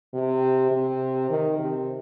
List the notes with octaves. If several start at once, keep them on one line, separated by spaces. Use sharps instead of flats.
C3
C3
D#3
C3